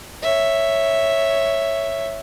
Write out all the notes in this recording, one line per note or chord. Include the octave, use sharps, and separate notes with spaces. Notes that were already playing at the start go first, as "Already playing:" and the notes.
C#5 E5